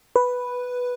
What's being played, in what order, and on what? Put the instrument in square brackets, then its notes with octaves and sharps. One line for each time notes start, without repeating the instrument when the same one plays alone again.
[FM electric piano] B4